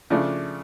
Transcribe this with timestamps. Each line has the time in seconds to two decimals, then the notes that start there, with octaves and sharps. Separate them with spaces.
0.10 C#3 F3 A3 D4